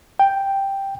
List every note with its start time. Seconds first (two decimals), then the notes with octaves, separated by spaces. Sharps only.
0.19 G5